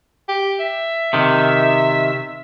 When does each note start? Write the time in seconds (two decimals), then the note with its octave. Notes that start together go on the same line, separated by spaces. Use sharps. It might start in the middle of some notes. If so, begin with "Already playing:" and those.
0.28 G4
0.60 E5
1.13 C3 D#3